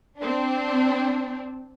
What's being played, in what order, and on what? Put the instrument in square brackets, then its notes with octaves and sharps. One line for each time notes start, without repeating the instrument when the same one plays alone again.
[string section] C4 D4